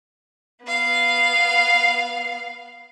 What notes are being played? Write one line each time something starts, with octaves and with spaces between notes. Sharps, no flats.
B3 F5